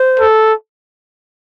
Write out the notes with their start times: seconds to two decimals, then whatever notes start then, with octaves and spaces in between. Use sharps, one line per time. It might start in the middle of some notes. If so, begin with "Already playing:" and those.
Already playing: C5
0.19 A4